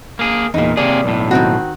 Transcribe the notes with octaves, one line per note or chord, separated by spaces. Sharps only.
A#3 G#4
E2 A#2 A#3 D#4
C3 A#3 G#4 D5
B1 A2
D#3 C4 F#4